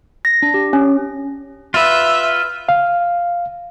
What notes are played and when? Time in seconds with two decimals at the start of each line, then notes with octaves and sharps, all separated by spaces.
0.25 A#6
0.43 D4
0.54 G4
0.73 C#4
1.74 F4 B4 E5
2.69 F5